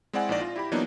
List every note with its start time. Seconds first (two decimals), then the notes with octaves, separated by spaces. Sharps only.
0.13 G#3 C4 E4 D5 F#5 G#5
0.29 A#1 A#2 D#4 D5 A#6
0.40 F4
0.56 E4 G4 B5
0.72 E3 F#3 A#3 B3 D4 D#4